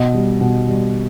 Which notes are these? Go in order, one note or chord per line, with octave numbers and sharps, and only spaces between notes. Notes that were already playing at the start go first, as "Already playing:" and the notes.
Already playing: B2 D#5
G3
B2
G3